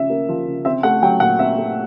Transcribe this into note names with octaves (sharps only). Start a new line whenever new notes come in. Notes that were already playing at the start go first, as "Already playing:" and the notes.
Already playing: C#3 F3 C#4 E5
A#3
F3
C#3
C4 E5
A3 F#5
F#3 G5
A#2 F#5
C4 E5
A3